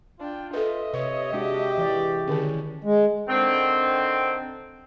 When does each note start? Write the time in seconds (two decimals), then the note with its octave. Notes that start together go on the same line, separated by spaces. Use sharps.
0.20 D4 F4 G5
0.53 A4 B4 D#5 E5
0.93 C3 B4 C#5
1.33 G#3 D4 F#4 G4
1.78 E3 D5
2.27 D3 D#3 C#4 G#4
2.84 G#3
3.28 D3 D#3 C4